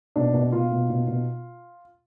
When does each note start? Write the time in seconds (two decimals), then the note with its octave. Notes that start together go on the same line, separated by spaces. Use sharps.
0.16 B2 D4
0.34 B2
0.52 B2 F4
0.71 B2
0.89 B2
1.07 B2